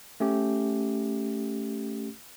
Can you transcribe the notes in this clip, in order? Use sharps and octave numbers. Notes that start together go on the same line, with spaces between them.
A3 C#4 G4